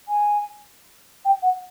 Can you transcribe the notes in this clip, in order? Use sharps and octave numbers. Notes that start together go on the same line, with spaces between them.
G#5
G5
F#5